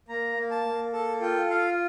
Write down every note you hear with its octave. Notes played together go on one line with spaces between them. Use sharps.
A#3 A#5
A#3
A5
A#3
A4 A5
F4 G5
F4 F5